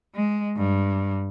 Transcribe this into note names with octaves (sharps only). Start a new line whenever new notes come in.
G#3
G2